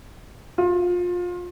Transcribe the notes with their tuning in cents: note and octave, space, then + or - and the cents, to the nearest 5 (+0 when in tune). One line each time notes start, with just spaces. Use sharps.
F4 +25